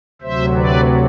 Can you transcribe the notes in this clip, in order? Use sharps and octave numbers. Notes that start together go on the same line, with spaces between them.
D2 C3 F#3 C5 E5
B4 D5